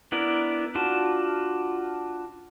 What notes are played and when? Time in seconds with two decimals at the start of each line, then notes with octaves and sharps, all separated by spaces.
0.12 B3 D4 E4 A#4 D5
0.75 D4 F4 F#4 A5